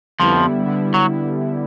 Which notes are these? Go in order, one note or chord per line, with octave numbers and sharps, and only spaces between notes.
F2 D3 F3 G3 B3 E4
D3 G3 B3 E4
F#3